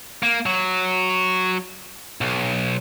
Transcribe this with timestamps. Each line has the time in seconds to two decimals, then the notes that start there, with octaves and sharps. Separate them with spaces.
0.23 A#3
0.46 F#3
2.21 B1